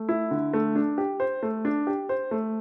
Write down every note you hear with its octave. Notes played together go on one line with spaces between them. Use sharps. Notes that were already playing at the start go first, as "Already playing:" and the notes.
Already playing: A3
E4
D3
A3
D4
G4
C5
A3
D4
G4
C5
A3